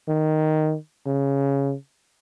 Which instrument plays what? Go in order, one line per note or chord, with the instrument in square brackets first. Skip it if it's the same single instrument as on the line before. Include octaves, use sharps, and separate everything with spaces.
[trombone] D#3
C#3